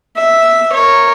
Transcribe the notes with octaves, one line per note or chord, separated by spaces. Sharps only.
E5
A#4 C#5